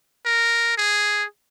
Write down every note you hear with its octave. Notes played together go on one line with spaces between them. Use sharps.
A#4
G#4